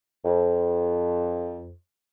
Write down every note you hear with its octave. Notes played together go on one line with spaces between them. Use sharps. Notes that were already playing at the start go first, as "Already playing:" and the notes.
F2